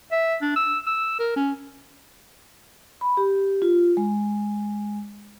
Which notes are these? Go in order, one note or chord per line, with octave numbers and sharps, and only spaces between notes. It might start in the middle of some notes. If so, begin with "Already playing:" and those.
E5
D4
E6
E6
A#4
C#4
B5
G4
F4
G#3